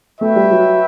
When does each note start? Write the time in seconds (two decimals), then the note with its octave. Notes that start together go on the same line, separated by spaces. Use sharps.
0.21 A3 F#4 B4 E5 G5
0.36 G3
0.51 F#3